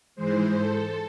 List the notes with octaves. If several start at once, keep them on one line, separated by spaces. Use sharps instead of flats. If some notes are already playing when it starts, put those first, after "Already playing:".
G#2 E3 G#3 C5
A4